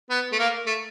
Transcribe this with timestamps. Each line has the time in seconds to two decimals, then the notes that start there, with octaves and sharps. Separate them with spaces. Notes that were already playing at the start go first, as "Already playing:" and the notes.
0.10 B3
0.32 A3
0.39 A#3
0.67 A3